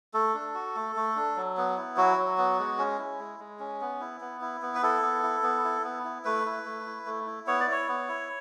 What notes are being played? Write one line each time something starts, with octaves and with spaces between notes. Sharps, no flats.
A3 A4
D4
F#4
A3
A3
D4
F#3
B3
E4
F#3 F#4
F#3
B3
G#3
C#4
E4
G#3
G#3
C#4
B3
E4
B3
E4
B3
B4
E4 A4
B3
E4
B3
E4
B3
E4
A3 B4
E4
A3
E4
A3
E4
B3 C#5
D5
E4 C#5
B3
E4